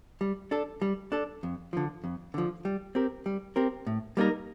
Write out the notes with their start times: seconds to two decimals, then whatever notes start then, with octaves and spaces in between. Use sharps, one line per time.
0.21 G3
0.51 D4 A4
0.82 G3
1.12 D4 A4
1.43 F2
1.73 D3 F3
2.04 F2
2.34 D3 F3
2.65 G3
2.95 C4 G4 A#4
3.26 G3
3.56 C4 G4 A#4
3.87 A2
4.17 G3 A#3 D#4 A#4